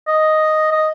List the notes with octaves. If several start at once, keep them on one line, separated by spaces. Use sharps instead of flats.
D#5
D#5